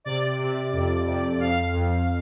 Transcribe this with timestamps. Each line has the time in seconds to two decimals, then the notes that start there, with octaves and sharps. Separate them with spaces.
0.04 C3 D5
0.39 C3
0.73 F2
1.06 F2
1.39 F2 F5
1.73 F2